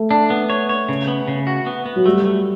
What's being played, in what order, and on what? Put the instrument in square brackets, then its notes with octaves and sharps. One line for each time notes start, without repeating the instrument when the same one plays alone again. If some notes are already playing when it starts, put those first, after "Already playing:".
Already playing: [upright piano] A3
[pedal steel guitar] D4
B3
C#5
C#5
C#3
B3
C#3
F#4
B3
B3
[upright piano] F#3
[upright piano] G3 [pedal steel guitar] A3
[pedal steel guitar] A3